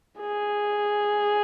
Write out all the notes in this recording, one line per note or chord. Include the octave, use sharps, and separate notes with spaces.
G#4